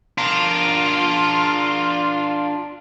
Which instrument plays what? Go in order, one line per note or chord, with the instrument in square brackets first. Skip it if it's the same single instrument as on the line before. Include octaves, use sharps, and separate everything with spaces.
[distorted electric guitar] D4 A#4 [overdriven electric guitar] F4